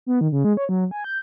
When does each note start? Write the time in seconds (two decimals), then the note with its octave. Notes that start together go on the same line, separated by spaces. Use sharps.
0.06 B3
0.21 D#3
0.32 C#3
0.44 G#3
0.57 C#5
0.69 F#3
0.91 G#5
1.04 G6